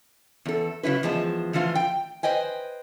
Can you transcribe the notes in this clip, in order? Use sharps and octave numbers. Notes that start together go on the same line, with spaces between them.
E2 A4
C#3 F#3 E4 B4
E2 F3 G#3 A5
A2 E3 F3 F4 F5
G5
B4 C5 D#5 G5 G#5